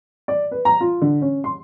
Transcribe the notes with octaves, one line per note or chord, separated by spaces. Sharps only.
D5
B4
A#5
F4
D3
C#4
C6